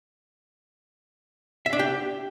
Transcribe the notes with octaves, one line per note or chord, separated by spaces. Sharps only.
E5
D4
G4